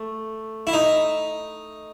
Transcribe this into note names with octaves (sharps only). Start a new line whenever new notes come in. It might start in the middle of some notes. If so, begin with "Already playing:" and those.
Already playing: A3
E4
D#4